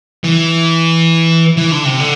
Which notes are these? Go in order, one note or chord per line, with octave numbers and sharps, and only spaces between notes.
E3
E3
D3
C3
D3